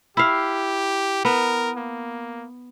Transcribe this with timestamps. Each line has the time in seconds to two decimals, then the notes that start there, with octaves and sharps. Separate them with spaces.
0.17 E4 G4 F5
1.25 B3 A#4
1.77 A#3